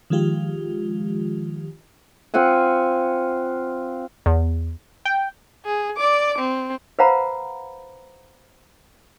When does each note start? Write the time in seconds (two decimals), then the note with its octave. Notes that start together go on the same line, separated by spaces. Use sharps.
0.10 D#3 F3 G#3 F4 G4
2.34 C4 F4 F#5 G#5
4.26 E2
5.05 G5
5.65 G#4
5.97 D5 D6
6.38 C4
6.99 B4 C5 F5 F#5 A#5 B5